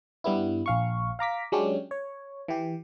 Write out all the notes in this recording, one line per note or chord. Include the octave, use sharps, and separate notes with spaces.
G2 G3 B3 E4
A#1 F5 C#6
F5 A#5 D6 B6
F#3 G#3 C#4 D4 G4
C#5
E3 G4